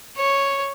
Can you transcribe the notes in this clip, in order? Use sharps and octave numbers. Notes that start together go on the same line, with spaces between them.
C#5